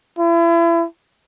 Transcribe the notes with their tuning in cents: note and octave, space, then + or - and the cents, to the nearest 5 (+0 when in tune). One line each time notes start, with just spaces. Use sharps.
E4 +35